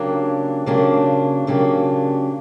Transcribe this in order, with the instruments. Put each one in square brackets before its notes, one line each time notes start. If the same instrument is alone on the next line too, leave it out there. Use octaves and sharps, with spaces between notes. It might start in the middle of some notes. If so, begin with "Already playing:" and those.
Already playing: [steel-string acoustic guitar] C#3 F#3 A#3 D4 G4
C#3 F#3 A#3 D4 G4
C#3 F#3 A#3 D4 G4